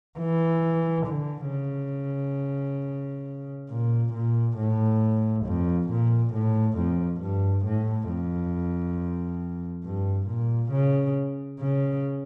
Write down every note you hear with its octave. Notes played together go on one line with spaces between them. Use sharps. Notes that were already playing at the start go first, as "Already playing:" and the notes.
E3
D3
C#3
A#2
A#2
A2
F2
A#2
A2
F2
G2
A2
F2
G2
A#2
C#3
C#3